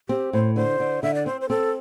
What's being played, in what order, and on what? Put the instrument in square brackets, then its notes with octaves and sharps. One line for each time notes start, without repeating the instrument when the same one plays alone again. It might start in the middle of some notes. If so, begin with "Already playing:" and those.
[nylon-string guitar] C4 [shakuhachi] G4
[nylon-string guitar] A2 [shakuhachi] C5
[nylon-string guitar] D3 [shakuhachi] C5
[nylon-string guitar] D3
[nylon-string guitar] D3 [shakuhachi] E5
[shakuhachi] D5
[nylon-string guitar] C4 [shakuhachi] C5
[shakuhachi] C5
[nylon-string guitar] C4 [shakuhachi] A4